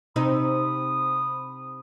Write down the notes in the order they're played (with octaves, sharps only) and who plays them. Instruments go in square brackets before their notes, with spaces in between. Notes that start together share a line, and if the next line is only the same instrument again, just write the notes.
[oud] C3 C4 D#4 [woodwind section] B5 D#6